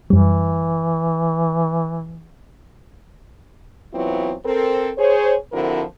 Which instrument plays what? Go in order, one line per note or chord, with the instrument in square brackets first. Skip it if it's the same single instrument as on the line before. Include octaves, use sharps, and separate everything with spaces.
[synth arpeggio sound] F#2 G3 [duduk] E3
[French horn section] E3 F#3 B3 C4 E4 F4
C4 A4 A#4
G#4 C5 C#5
D3 F3 C4 E4 F#4 A#4